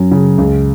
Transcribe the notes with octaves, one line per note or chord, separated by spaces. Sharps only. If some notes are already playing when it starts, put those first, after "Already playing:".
Already playing: F#2 F#3
C#3
C#2